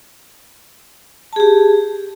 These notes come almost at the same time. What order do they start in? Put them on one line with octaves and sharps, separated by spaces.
A5 G#4 G4